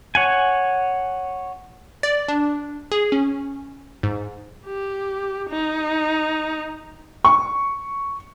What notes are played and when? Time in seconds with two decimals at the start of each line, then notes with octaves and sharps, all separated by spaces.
0.15 C#5 F#5 G#5
2.03 D5
2.28 D4
2.92 G#4
3.12 C#4
4.03 G#2
4.66 G4
5.50 D#4
7.25 C#6